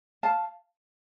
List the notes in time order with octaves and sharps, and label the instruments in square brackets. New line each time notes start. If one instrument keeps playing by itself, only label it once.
[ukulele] F5 A5